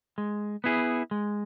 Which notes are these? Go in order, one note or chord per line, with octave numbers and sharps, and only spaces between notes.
G#3
B3 E4 G#4
G#3